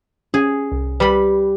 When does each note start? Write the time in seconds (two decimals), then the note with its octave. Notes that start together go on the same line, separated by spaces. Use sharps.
0.34 C#4 G#4
0.72 C2
1.00 G3 B4 B5